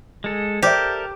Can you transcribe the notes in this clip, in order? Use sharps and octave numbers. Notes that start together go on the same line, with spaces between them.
G#3 A4
G4 A4 A#4 C5 D5 E5